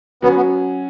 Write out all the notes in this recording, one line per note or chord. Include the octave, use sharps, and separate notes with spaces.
F#3 B3 C#4 F#4
B3